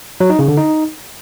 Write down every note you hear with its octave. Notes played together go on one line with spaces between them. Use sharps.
F#3
D#4
C#3
D3
D#4